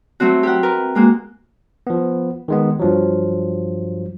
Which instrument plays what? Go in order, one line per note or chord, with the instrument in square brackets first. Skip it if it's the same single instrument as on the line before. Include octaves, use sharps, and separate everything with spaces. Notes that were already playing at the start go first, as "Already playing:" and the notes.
[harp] F#3 A3 C4 F#4
G4 A#4 F#5
A#4 B4
G#3 A#3 F#4
[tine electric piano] F3 B3
D#3 G#3 B3
G2 F3 F#3